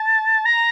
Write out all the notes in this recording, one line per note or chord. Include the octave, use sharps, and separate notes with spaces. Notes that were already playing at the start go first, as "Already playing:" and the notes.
Already playing: A5
A#5